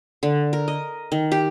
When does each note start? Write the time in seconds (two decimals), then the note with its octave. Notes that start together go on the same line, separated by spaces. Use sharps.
0.23 D3
0.53 A#4
0.68 D#5
1.12 D#3
1.32 G4